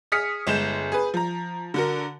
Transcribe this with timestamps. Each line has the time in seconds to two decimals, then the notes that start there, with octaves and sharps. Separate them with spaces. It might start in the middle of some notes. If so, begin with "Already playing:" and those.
0.12 G#4 D#6 F6 B6 C#7
0.47 G1 G#3 G6 E7
0.92 G#4 B4
1.14 F3 A#5
1.74 D3 F#4 A#4